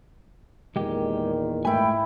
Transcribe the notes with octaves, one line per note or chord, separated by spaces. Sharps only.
E2 A#2 D#3 G#3 G4
G#2 A3 E4 B4 G5 G#5